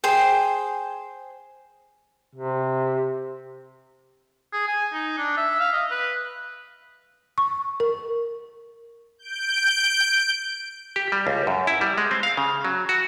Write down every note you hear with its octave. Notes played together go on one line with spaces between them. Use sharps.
G#4 C5 G5
C3
G#4
G#5
D#4
D4
E5
F5
D#5
B4
C#6
A#4
G6 D7
G4
G3
C#2
F#2
E4
G3
G#3
C4
F5
C#3
F#3
F#4